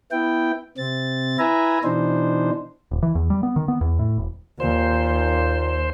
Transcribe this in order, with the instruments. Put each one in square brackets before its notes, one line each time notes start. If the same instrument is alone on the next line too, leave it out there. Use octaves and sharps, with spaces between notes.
[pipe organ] B3 E4 G5
C3 C4 A6
E4 B4 E5 G#5 A#5
B2 E3 D4 D#4 C5
[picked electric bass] D#1
E3
E2
G3
B3
D#3
B3
E2
A2
E1
[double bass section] D#2 [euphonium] A#2 [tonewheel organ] C5